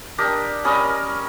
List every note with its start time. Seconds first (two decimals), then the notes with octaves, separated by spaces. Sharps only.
0.18 D4 G4 A#4 D#5
0.64 G3 C#4 A#4 D#5